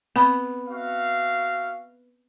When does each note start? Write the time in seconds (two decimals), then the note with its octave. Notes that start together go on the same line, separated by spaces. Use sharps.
0.16 B3 C4 B5
0.68 F#4 E5 F5